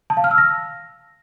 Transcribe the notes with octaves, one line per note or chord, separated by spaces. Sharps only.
A5
F5
F6
E6
A#6